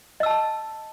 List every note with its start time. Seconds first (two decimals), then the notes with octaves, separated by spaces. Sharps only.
0.20 D#5
0.23 E6
0.26 A5